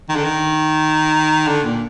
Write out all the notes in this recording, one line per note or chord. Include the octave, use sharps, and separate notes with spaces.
D#3
D3
D#3
D3
A#2